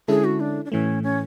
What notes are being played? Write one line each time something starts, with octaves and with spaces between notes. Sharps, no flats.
D3 G#3 C#4 E4 G#4 A4
F#4
D4
D4
A2 E3 A3 C#4
C#4